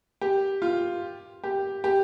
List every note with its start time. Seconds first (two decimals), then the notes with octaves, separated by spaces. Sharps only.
0.21 G4
0.62 F4
1.44 G4
1.84 G4